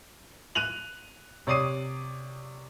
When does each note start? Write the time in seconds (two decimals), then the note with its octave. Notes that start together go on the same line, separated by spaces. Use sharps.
0.55 F#6 D#7 F7 F#7
1.47 C3 C#5 D5 D#6 C7 D#7